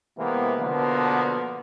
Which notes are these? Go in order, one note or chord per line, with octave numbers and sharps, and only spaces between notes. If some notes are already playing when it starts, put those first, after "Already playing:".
C3 E3 G#3 A#3 B3
B2 D3 F3 A#3 B3